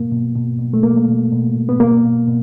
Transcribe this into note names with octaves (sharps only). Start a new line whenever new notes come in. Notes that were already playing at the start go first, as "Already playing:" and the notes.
Already playing: B2 A#3
B2
B2
B2
A3
B2 A#3
B2
B2
B2
B3
B2 A#3
B2
B2